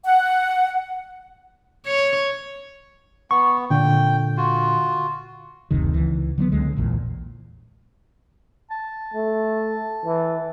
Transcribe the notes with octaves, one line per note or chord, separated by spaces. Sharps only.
F#5
C#5
B3 C#6
A#2 D3 G5
F4 F#4
F#1 D2 C3 D#3
C#2 E3
D3 F#3 G#3 B3
C#2 D3 G#3
A#1 E2 A#2
A5
A3
E3